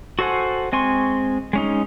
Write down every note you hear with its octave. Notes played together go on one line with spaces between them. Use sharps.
F#4 A4 C5 F#5 G#5
G#3 C4 G#5 C6 C#6
G#3 C#4 D#4